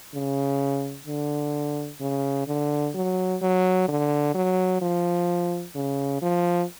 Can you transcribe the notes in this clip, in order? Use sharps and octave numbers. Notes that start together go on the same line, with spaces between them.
C#3
D3
C#3
D3
F#3
F#3
D3
F#3
F3
C#3
F3